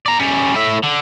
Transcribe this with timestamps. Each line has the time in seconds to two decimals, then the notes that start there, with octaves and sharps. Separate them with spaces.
0.06 D5 A#5
0.19 G3 C#4
0.56 A2 E5
0.83 D3